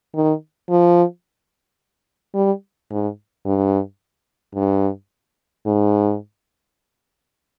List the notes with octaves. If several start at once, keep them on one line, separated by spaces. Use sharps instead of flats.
D#3
F3
G3
G#2
G2
G2
G#2